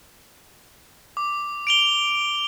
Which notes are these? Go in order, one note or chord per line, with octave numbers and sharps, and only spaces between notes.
D6
D7 F7 G7